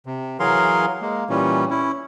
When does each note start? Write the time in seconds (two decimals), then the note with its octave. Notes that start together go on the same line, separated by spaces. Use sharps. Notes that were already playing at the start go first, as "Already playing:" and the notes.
0.06 C3
0.40 E3 F#3 G#4 A#4 F5 C6
1.01 G#3 A#3
1.30 A#2 E3 G3 C#4
1.70 C#4 E4